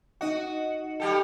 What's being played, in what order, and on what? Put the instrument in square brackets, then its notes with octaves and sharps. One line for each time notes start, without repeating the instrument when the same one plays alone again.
[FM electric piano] D#4 D#5 F#5 [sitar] F#4
[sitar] G3 G4 A4